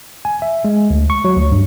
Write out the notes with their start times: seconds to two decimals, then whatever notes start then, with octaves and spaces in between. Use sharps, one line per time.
0.25 G#5
0.42 E5
0.65 G#3
0.90 D2
1.10 C#6
1.25 F#3
1.37 D2
1.52 G2